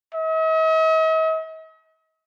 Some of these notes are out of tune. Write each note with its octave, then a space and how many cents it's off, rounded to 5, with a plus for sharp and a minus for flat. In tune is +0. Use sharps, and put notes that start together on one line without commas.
D#5 +45